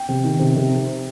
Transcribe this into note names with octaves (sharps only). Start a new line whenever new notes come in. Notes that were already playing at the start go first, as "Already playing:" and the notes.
Already playing: G5
C3
D#3
C3
C3